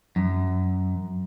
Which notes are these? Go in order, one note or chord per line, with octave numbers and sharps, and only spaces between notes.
F#2